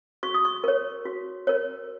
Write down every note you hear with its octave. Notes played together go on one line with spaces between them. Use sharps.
F#4 C#6
D#6
C#6
A#4 C#5
F#4
A#4 C#5